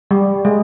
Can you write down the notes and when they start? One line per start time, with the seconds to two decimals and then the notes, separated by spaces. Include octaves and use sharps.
0.11 G3
0.45 G#3